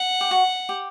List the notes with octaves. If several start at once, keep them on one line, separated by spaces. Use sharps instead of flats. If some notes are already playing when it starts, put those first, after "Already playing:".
Already playing: F#5
G4
F#4
G4